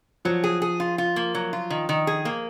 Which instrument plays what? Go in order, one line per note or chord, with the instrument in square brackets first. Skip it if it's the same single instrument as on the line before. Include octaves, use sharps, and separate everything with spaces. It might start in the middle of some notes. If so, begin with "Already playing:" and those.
[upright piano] F3 [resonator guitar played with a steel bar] F#3
[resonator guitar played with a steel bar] G#4
G#4
F4
F4
A#3
F#3
F4
D#3
D#3
G#4
A#3